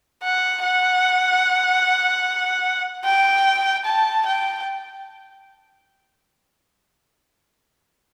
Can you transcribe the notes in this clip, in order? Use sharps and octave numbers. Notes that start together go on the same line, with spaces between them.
F#5
F#5
G5
A5
G5